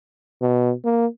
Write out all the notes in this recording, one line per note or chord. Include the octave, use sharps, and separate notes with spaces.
B2
A#3